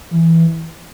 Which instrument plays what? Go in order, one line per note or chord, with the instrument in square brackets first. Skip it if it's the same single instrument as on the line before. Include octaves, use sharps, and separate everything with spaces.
[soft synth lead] E3